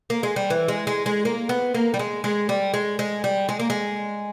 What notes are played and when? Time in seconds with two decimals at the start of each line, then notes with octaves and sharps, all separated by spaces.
0.10 A#3
0.23 G#3
0.36 G3
0.50 E3
0.68 G#3
0.87 G#3
1.06 G#3
1.25 A#3
1.49 B3
1.74 A#3
1.94 G3
1.99 G#3
2.24 G#3
2.49 G3
2.74 G#3
2.99 G#3
3.24 G3
3.49 G#3
3.60 A#3
3.70 G#3